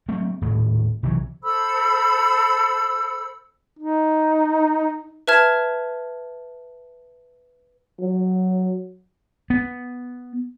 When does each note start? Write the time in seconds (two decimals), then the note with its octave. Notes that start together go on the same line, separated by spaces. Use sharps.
0.08 F#3 A3 A#3 C4
0.41 D#1 A2
1.03 B1 C3 E3 F#3
1.44 A4 C5 B5 E6
3.79 D#4
5.28 B4 E5 A5 F6 G#6 E7
8.00 F#3
9.50 B3